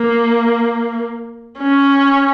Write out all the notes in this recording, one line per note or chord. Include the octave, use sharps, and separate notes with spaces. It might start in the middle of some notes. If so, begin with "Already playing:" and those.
Already playing: A#3
C#4